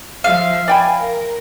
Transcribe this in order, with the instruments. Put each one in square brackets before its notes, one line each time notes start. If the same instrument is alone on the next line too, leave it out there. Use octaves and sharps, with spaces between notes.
[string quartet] F3 E5 [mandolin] F5
[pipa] D5 G5 B5 [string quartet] G#5
[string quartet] A#4